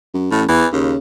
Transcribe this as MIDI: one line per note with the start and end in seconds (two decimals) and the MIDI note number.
0.14 0.31 42
0.32 0.48 33
0.32 0.43 45
0.49 0.65 40
0.49 0.67 52
0.73 0.93 39
0.73 0.98 49